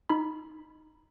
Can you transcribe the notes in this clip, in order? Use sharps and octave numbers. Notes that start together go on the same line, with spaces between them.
D#4 B5